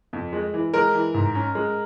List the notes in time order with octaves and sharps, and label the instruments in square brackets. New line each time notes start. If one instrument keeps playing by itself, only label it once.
[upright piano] F2
G#3
E3
[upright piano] G#3 [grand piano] A#4
[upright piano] E3
G#2
C#4
G#3